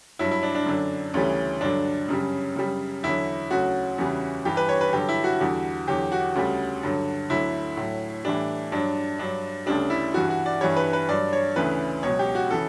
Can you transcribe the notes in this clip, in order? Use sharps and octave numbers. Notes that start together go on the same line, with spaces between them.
G2 F#3 E4
E4
D4
D4
F#2 D3 F#3
D2 C#3 E3 G3 C#4
G2 D3 F#3 D4
F#2 C#3 G3
F#2 C#3 G3
E2 D3 F#3 E4
D2 C#3 F#3 F#4
E2 C#3 E3 G3
G2 E3 G3 G4
B4
C#5
B4
G2 D3 F#3 G4
E4
F#4
E2 D3 G3
E2 D3 F#3 G4
F#4
D2 C#3 G3
G2 D3 F#3
D2 D3 F#3 E4
A2 F#3
A2 E3 G3 D4
G2 F#3 D4
G2 F#3 D4
D2 C#3 G3 D4
E4
G2 E3 G3 F#4
F#4
D5
G2 E3 G3 C#5
B4
B4
G2 F#3 D5
C#5
D2 C#3 E3 B4
C#2 B2 F#3 C#5
G4
F#4
C#3 E3 A4